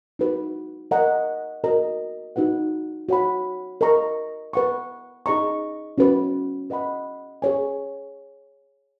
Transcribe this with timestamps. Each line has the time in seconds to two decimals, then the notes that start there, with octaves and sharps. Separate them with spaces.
0.19 D#4 F#4 B4
0.91 A#4 D#5 F#5 A#5
1.64 F#4 A#4 D#5 A#5
2.36 D#4 F#4 B4 F#5
3.09 F#4 C#5 F#5 B5
3.81 A#4 D#5 A#5 C#6
4.53 B4 F#5 C#6
5.26 D#4 G#4 D#5 A#5 C#6
5.98 C#4 F#4 B4
6.70 B4 D#5 F#5 B5
7.42 G#4 C#5 G#5